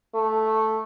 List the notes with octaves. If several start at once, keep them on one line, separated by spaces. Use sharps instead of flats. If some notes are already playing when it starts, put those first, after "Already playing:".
A3